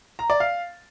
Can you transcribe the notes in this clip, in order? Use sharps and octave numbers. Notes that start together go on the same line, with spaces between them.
A#5
D5
F5